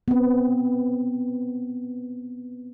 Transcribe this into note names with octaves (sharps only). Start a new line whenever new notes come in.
B3 C4